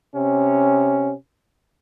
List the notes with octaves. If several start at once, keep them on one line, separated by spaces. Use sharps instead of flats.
C3 C#4